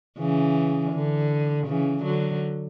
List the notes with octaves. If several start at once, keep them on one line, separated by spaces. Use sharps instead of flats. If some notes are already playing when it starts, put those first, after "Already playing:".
C#3 E3
D3
C#3 E3
D3 F#3